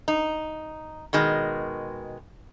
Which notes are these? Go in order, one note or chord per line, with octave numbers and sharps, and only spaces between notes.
D#4
B2 D#3 G#3